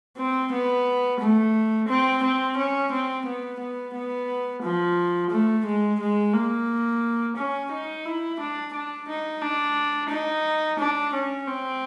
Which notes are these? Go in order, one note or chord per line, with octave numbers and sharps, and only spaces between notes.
C4
B3
A3
C4
C4
C#4
C4
B3
B3
B3
F3
A3
G#3
G#3
A#3
C#4
D#4
E4
D4
D4
D#4
D4
D#4
D4
C#4
C4